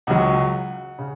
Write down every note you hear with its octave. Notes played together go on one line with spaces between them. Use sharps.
C#2 C#3 F#3 F#5
C#3